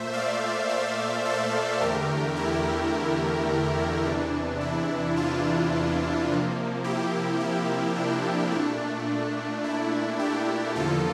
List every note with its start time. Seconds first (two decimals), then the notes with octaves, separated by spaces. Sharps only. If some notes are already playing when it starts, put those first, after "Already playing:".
Already playing: A#2 A3 C5 E5
0.13 D5 F5
0.69 C5 E5
1.25 A4 C5
1.81 E2 D3 A3 G4 A#4
2.36 E4 G4
2.93 E4
4.04 E2 C3 E3 D4
4.61 E4
5.17 D4 F4
6.28 C3 F3 A#3
6.84 E4 G4
7.40 E4
7.96 D4
8.51 A#2 A3 D4
9.64 E4
10.19 E4 G4
10.75 E2 D3 F3 A#3 F4 A4